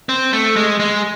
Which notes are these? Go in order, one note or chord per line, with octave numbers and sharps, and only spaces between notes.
C4
A3
G#3
G#3